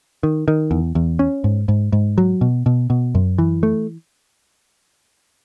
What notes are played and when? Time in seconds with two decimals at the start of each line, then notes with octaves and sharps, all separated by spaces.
0.23 D#3
0.48 D#3
0.71 E2
0.95 E2
1.19 C#4
1.44 G#2
1.68 G#2
1.92 G#2
2.18 F#3
2.41 B2
2.66 B2
2.90 B2
3.15 F#2
3.38 E3
3.63 A3